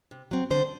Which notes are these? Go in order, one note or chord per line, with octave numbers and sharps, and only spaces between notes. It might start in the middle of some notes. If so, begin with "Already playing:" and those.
C3
F#3 C4
D3 C5